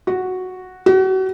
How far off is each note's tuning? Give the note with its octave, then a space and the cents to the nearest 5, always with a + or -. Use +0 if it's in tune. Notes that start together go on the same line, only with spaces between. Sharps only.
F#4 -5
F#4 +35